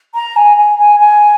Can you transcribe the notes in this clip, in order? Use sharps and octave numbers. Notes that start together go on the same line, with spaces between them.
A#5
G#5
G#5
G#5
G#5